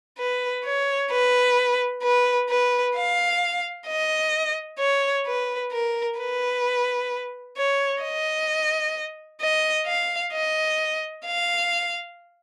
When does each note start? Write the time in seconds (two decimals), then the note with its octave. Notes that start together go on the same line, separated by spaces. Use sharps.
0.18 B4
0.65 C#5
1.11 B4
2.03 B4
2.49 B4
2.95 F5
3.87 D#5
4.79 C#5
5.26 B4
5.71 A#4
6.19 B4
7.57 C#5
8.02 D#5
9.41 D#5
9.87 F5
10.33 D#5
11.25 F5